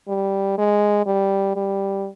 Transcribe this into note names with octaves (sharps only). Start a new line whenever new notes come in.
G3
G#3
G3
G3